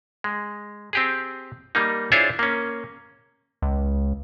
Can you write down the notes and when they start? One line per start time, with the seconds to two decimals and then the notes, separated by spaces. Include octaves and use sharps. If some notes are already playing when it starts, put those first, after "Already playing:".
0.24 G#3
0.93 C4 G4 G#4
1.75 G3 A#3 D#4
2.12 D4 E4 F4 G#4 C5 C#5
2.39 A#3 C#4
3.62 C#2